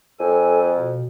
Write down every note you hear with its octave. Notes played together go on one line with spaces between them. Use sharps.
F2 A4 G#5
B2